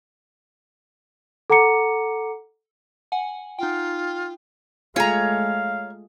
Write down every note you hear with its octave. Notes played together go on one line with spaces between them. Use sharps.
A4 F#5 A#5 D6 C#7
F#5 G#5
D#4 F4 G5
G#3 A3 F4 G#4 C#5 F5 A#5